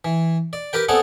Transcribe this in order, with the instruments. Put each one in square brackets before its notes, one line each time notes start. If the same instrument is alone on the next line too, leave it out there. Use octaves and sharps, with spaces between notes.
[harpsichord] E3
D5
G4 A#4 B4 G5
B3 C4 G#4 A4 D5 F#5